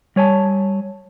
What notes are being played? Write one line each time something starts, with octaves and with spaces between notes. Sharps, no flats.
G3 C#5 G#5 A5